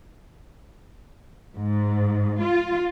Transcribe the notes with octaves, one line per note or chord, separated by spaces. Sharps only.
G#2
F4